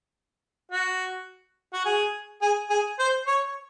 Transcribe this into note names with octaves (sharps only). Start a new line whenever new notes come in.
F#4
F#4
G#4
G#4
G#4
C5
C#5